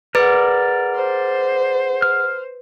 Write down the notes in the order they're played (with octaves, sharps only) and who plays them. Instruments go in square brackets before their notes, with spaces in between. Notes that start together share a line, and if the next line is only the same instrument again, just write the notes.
[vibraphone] G#4 F#5 [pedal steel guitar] A#4 D5 [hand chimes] B4
[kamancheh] C5
[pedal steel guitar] F6